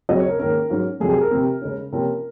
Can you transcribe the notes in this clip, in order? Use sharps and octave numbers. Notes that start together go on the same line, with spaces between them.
C#3 F#3 C4 D#5
C#5
A#4
G#2 D#3 A#3 C#4 A#4
G#2 F#3 C#4
F2 C3 F#3 G#4
G#4
A#4
C3 F3 C4
C#3 G#3 C#4
C3 F3 A#3 C#4 A#4